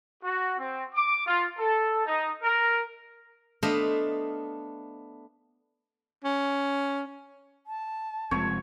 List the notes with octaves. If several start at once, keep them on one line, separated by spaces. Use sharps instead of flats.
F#4
C4
D6
F4
A4
D#4
A#4
A3 B3 D4 C5 D#5 F5
C#4
A5
F1 F#2 F3 G#3 C4 C#5